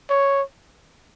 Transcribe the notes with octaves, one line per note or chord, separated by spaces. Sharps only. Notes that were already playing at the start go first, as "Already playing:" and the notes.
C#5